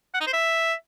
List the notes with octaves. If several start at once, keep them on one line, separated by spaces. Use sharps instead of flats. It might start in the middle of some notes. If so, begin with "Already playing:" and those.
F#5
D#4
C5
E5